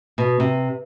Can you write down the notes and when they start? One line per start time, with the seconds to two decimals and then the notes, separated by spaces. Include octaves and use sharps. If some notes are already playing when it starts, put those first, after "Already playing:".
0.18 B2
0.40 C3